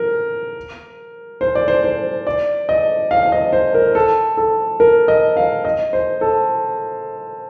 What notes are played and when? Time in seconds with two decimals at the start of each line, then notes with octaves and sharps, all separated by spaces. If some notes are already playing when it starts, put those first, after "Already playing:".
Already playing: A#4
1.41 C5
1.55 D5
1.68 C5
1.84 C5
2.27 D5
2.69 D#5
3.11 F5
3.23 F5
3.32 D#5
3.53 C5
3.74 A#4
3.95 A4
4.37 A4
4.80 A#4
5.08 D#5
5.37 F5
5.65 D#5
5.93 C5
6.21 A4